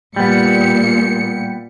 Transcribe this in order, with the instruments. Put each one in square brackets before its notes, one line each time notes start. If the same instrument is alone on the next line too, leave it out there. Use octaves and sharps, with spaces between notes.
[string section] A#2 C#7 [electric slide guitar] G3 B3